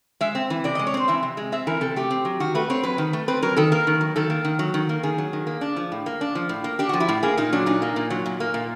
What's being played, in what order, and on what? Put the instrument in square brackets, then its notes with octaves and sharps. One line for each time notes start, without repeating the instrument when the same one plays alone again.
[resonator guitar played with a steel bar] G#3 E5
C4
E3
C3 D5
G#3 D#5
C#5
C4 C5
E3 E5
C3
G#3
C4 E5
E3 A#4
C3 A4
A3 G4
C4
F#3
D#3 F#4
A3 B4
C4 C#5
F#3 B4
D#3
A3
C4 B4
F#3 A#4
D#3 A4
A#3 A#4
D#3
F#3
D#3 A4
A#3
D#3
F#3
D#3
A#3
D#3 G#4
F#3
D#3
A#3
D4
F3
A2
A#3
D4
F3
A2
A#3
D4 G4
F3 F#4
E4
A2
A#3 G#4
A#2 D#4
F#3 D4
A#2 D#4
A#3
A#2
F#3
A#2
A#3
A#2